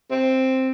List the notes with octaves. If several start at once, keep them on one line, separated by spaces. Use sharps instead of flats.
C4